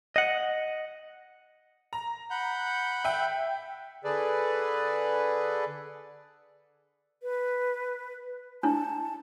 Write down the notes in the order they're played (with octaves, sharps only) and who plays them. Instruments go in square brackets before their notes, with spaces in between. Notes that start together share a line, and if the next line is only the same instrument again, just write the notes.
[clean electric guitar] D#5 F#5
[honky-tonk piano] A#5
[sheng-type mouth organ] F#5 B5 G6
[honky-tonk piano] E5 G5
[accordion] D3 G#4 A4 B4 D5
[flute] B4
[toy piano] D4 E4 [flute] A5